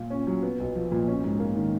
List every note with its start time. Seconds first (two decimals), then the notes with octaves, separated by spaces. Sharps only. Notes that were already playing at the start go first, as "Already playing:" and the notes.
Already playing: A#2 F4
0.10 C#4
0.27 F#3
0.43 B3
0.59 B1
0.75 F3
0.92 A#2
1.08 C#4
1.24 G#2
1.40 A#3
1.56 D#3